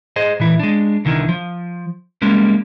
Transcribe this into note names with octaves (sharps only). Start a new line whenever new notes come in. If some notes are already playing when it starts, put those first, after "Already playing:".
G#4 C5 D#5
A#2 E3 E4
G#3 D4
C2 D3 D#3 E4
F3
G3 G#3 A#3 C#4